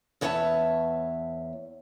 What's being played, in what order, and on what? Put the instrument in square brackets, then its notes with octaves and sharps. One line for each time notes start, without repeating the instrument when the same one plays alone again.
[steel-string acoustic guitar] E2 B3 C#5 E5 F#5 A5